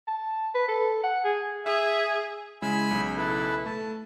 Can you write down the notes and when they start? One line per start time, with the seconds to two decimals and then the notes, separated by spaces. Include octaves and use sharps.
0.07 A5
0.54 B4
0.68 A4
1.03 F#5
1.24 G#4
1.66 G#4 E5
2.62 C#3 G#3 E4 G#5 B5 E6
2.91 B1 C#3
3.17 E4 A4 B4
3.66 A3 A5